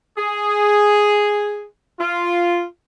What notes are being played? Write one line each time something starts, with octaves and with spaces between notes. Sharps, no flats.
G#4
F4